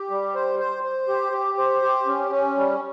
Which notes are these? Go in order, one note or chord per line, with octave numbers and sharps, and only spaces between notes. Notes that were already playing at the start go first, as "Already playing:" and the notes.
Already playing: G4
G3
C5
C5
C5
G4
G4
C5
G4
C#4
C#4
G3